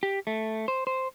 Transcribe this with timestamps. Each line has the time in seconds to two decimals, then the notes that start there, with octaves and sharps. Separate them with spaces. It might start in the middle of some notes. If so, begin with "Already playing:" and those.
0.03 G4
0.27 A3
0.68 C5
0.87 C5